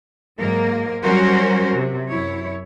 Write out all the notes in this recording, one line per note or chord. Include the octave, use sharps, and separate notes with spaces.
G#2 F#3 A#3 A#4
F#3 G3 C#4 F#4 A#4 C5
C3 F#3
F#2 E4 C#5